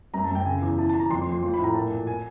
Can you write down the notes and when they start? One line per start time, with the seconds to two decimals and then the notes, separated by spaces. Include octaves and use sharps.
0.14 F#2 A#5
0.24 A5
0.30 F#2 G5
0.45 C#3 G#5
0.62 E2
0.78 E3 A5
0.89 E3 A5
0.99 A#5
1.10 F2 C6
1.22 C6
1.27 F3
1.32 C6
1.43 F3 C6
1.54 A2 B5
1.64 A#5
1.74 A#2 A5
1.90 A#2
2.07 G#5